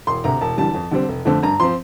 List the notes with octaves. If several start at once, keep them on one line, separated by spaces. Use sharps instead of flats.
E1 C6
D2 C3 A#5
E1 A5
E2 D3 G3 A5
F2
D3 G3 C4
F1
F2 D3 A3 C4
G2 A#5
F3 C4 C6